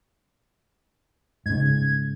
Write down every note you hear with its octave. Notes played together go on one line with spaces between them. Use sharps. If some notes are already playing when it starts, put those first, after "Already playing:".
G#2 C#3 G#6